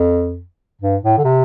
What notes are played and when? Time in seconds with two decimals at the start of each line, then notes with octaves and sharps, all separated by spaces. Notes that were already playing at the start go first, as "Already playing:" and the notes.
Already playing: F2
0.81 G2
1.03 A2
1.18 D3
1.24 C3